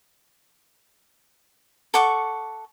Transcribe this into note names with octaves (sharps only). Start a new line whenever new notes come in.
A4 F#5 C#6 D6